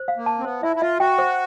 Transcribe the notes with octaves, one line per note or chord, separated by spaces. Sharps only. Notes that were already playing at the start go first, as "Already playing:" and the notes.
Already playing: C5
F5
A#3
A5
C4
B3 C5
E4 E5
E4
F4 E5
F#4 G5
C5